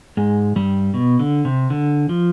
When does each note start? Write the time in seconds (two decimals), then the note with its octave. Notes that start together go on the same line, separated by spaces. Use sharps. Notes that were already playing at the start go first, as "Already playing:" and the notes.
0.17 G#2 G#3
0.56 G2 G3
0.94 B2
1.19 D3
1.45 C3
1.70 D3
2.09 F3